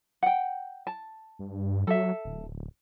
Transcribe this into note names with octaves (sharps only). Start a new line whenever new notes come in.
F#5 G5
A5
G2
F#3 A4 E5
D1